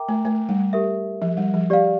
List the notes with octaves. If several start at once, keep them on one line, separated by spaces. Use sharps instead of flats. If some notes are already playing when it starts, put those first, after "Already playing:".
Already playing: A#4 E5 G5 A#5 D6
A3
A3
G3
G4 A#4 E5
F3
G3
F3
G4 D5 F5